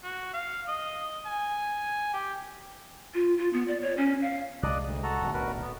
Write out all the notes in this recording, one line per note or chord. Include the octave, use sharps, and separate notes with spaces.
F#4
F5
D#5
G#5
G4
F4
F4
B3
D5
C#5
C#4
F5
C2 G#3 D5 D#5 F#6
D2
F#4 A4 A#5
D1 B1 D3
F#4 A#4 B4
B3